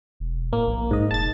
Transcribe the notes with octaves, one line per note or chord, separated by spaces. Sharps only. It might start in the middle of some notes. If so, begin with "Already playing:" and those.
E1
A2 A#3
A#1
G#2 D#5
E1 A5 A6